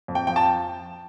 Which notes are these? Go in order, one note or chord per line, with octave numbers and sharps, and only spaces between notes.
F2
G5
F3 G5
A5